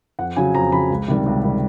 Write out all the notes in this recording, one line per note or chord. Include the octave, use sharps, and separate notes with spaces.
F2 F#5
C#3 F#3 G#5
F2 A#5
C#3 F#3 B5
C#2
C3 D#3 G3
C#2
C3 D#3 G3